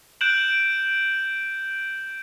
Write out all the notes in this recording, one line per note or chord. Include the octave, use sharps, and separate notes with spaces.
F#6 G6 D7 E7 F#7